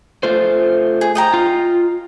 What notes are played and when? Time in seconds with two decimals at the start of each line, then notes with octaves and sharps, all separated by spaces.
0.23 A3 F4 C5
1.01 G#4
1.15 D#5 G5 A#5
1.34 F4